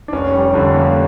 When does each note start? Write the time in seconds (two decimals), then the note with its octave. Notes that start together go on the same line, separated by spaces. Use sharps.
0.08 D4
0.12 F1 C#4
0.33 G3
0.54 F2 D3 G3
0.74 A#3